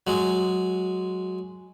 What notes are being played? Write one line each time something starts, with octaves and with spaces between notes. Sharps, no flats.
F#3 G#3